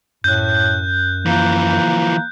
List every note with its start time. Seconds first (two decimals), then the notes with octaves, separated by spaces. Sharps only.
0.24 F#2 A2 F#6 G6
1.26 E3 F3 A#3